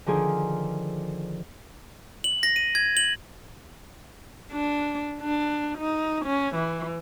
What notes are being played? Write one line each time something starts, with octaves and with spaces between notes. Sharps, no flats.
D3 D#3 F3 G#4
F#7
A#6
D#7
G#6
F#7
D4
D4
D#4
C#4
E3